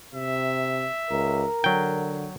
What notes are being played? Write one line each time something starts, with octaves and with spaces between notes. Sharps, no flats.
C3 E5
C#2 A#4
D3 F#3 G5